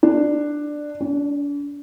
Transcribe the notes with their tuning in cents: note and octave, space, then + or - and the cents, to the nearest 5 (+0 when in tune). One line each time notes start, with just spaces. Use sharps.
D4 +10
D4 -40